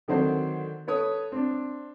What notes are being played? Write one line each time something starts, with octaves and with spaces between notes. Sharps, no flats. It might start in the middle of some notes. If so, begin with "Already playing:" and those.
D3 D#3 F#3 C4 F#4 C5
A4 B4 C#5 D#6
C4 D4